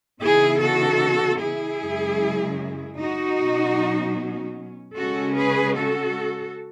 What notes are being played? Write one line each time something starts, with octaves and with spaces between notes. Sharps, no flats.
C#3 E3 B3 D#4 E4 G#4
F#4 A4
E4 G#4
F#2 C#3 G#3
D#4 F#4
B2 F#3 C#4
C#3 G#3 C#4 F#4 A4
G#4 B4
F#4 A4